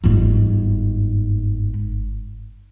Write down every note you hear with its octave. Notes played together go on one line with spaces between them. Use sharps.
G1 G#2